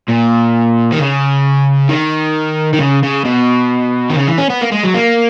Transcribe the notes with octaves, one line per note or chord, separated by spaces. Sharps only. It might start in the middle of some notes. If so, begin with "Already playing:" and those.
A#2
D#3
C#3
D#3
D#3
C#3
C#3
B2
D#3
C#3
E3
C#4
B3
A#3
G#3
F#3
A#3